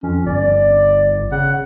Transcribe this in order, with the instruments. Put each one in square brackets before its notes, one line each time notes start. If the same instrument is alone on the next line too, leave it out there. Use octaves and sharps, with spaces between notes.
[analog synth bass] F2 [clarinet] C#4
[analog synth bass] G1 [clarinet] D5
[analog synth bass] C#3 [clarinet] F#5